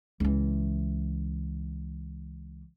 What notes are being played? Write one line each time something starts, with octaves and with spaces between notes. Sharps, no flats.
C#2 E3